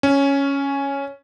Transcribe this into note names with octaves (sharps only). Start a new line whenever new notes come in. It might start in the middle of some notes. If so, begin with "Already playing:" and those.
C#4